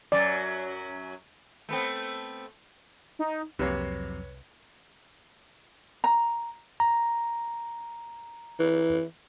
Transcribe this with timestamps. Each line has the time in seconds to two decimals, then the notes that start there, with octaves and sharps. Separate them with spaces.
0.12 F#2 F#3 D5
1.69 A3 B3 C4
3.19 D#4
3.59 C2 F2 C3 F#3 A#3 B4 C#5
6.04 A#5
6.80 A#5
8.60 E3